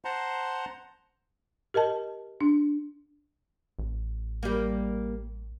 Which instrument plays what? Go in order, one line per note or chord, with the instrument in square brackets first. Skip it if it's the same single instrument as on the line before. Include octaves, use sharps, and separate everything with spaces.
[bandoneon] C5 F#5 A5 A#5 C6
[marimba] G4 A#4 D#5 A5
D4
[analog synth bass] A1
[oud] G3 A#3